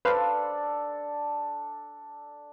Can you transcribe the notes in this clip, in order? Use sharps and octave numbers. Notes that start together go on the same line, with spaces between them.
D4 A4 B4 C5 F5